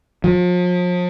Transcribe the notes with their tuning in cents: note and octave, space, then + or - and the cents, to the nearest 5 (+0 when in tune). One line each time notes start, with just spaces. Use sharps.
F3 +40